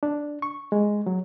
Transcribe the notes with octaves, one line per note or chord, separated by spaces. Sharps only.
D4
C#6
G#3
F#3